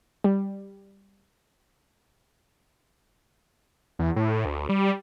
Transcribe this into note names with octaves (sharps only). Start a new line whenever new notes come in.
G3
E2
A2
D2
G3